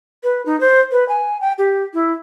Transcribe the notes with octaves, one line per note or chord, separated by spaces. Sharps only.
B4
D#4
C5
B4
G#5
G5
G4
E4